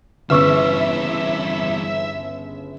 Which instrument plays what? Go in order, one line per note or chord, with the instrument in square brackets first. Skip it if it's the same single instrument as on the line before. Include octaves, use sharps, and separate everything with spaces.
[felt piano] G1 C#3 [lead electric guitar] E3 G3 [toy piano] B4 C#6 E6 [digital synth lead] E5